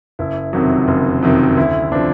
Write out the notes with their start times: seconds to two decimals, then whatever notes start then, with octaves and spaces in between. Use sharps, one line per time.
0.19 F#1 E4
0.53 F2 C3 D#3 F#3
0.88 F#1
1.22 F2 C3 D#3 F#3
1.57 D2 E4
1.92 C3 F3 D4